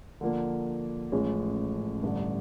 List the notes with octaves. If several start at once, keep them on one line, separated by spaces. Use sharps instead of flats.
D3 F3 A#3
A1 A2 F3 G#3 C#4
A1 G2 D3 G3